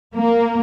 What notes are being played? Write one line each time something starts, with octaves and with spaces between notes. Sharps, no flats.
A#3